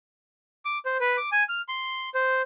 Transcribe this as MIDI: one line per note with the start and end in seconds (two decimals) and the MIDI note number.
0.65 0.78 86
0.86 0.97 72
1.00 1.17 71
1.17 1.29 86
1.32 1.43 80
1.49 1.61 89
1.69 2.09 84
2.15 2.42 72